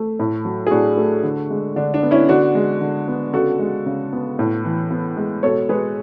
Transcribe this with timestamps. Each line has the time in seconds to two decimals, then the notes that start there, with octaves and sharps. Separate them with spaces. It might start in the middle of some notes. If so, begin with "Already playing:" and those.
Already playing: A3
0.19 A2
0.45 F#3
0.67 G#4
0.71 A2 D4 F#4
0.97 A3
1.23 D3
1.50 G#3
1.76 D3 D4
1.94 D4
2.03 B3
2.11 C#4 E4
2.29 D3 D4 F#4
2.55 G#3
2.81 D3
3.08 B3
3.33 C#3 F#4 A4
3.59 G#3
3.86 C#3
4.13 B3
4.39 A2
4.65 E3
4.91 B3
5.17 G#3
5.43 B2 A4 C#5
5.69 G#3 G#4 B4